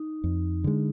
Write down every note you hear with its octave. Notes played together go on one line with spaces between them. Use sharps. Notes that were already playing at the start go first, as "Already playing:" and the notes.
Already playing: D#4
F2
D3 G#3